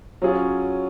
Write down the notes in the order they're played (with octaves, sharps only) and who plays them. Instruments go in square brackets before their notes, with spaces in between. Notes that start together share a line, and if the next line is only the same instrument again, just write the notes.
[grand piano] F#3 C#4 F4 G#4